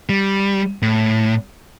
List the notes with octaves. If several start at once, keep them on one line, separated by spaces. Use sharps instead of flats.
G3
A2